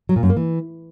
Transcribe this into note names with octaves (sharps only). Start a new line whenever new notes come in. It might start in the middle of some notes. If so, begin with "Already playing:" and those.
F#3
A#2
F#2
A#3
E3